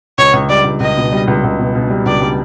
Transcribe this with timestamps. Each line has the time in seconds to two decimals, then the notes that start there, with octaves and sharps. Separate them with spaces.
0.18 C#2 C#5
0.33 C#2
0.49 G3 D5
0.64 C#2
0.80 C#2 D#5
0.97 B2
1.12 G3
1.28 C#2
1.44 C#2
1.59 B2
1.75 B2
1.90 G3
2.06 C#2 D5
2.21 G3